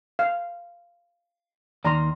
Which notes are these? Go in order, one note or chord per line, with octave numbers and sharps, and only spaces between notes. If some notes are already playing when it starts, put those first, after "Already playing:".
F5
D#2 D#3 D5 A#5 C6